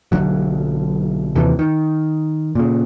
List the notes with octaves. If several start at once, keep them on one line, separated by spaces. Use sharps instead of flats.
B1 D3 F#3
D#2 C3 E3
D#3
A#2 C#3